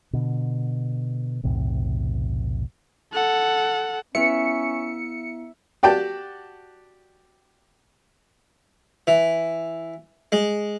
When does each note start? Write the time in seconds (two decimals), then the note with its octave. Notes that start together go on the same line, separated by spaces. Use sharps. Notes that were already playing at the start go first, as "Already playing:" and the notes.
0.13 B2 D3
1.44 B1 E2 A2 C3
3.13 A4 F#5
4.15 B3 C#4 E4 E5 C#7
5.83 F#4 G4 D5 G5 A5
9.07 E3
10.32 G#3